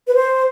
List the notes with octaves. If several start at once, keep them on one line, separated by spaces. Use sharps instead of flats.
B4
C5